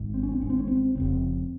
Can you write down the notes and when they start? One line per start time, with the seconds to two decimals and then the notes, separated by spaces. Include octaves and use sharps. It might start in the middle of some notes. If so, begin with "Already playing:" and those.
Already playing: G#1 G#2
0.14 C4
0.23 C#4
0.32 C4
0.41 G#1 G#2 C#4
0.50 C4
0.59 C#4
0.67 C4
0.95 D#2 C#3 C4
1.00 F1